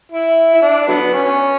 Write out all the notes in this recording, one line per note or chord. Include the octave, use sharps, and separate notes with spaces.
E4
E4
D4
D3 F#3 B3
C#4